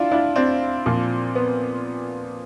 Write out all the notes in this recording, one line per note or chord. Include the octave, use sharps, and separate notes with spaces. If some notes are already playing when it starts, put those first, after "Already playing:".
Already playing: D4 E4 F4
D4 E4
C4 D4
A#2 F3
B3